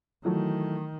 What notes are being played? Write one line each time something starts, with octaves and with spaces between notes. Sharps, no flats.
D#3 E3 F#3 A3